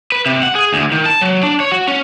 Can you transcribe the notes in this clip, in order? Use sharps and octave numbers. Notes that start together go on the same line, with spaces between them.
B4
C3
F#5
G#4
D2
D#3
A5
F#3
D4
C#5
F#4
C#4